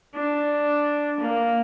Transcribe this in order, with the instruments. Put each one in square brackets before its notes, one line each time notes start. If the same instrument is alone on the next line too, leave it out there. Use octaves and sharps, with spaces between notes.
[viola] D4
A#3